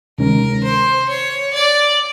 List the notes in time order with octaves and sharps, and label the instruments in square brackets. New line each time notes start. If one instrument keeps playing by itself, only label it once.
[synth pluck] D2 C3 D#3 G#3 C#4 [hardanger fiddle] A#4
[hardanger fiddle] C5
C#5
D5